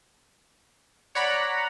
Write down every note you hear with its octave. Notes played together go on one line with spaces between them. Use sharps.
C#5 D5 F#5 A#5 B5